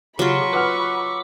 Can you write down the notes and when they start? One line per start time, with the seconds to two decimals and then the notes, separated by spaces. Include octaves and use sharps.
0.19 C#3 F#3 F4 G4 B5 C#6
0.53 B4 F#5 D6 E6 F6